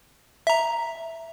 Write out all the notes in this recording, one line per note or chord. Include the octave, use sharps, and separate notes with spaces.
E5 A#5